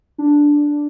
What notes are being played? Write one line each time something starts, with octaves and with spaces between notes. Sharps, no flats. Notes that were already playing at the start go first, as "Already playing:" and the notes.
D4